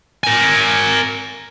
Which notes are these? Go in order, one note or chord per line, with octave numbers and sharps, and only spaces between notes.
A#4 G#5